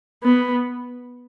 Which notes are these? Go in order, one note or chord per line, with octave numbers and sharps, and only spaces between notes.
B3